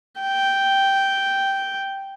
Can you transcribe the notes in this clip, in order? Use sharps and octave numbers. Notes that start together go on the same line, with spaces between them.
G5